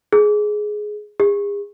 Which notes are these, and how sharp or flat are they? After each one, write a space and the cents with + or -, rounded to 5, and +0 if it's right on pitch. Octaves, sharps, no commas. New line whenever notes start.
G#4 +10
G#4 -40